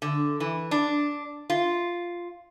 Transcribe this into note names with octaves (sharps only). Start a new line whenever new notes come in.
D3
E3
D4
F4